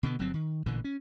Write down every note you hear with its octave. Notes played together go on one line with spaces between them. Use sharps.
B2 D3 B3
G1 F#3 G3 C4
D#3
A1 A#2 D3 E3
C#4